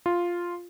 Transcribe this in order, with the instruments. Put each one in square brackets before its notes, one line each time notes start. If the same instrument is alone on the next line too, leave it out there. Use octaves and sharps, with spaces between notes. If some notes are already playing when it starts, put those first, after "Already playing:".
[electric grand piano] F4